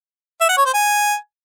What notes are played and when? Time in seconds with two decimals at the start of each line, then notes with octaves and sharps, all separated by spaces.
0.41 E5
0.49 F#5
0.57 C#5
0.66 C5
0.74 G#5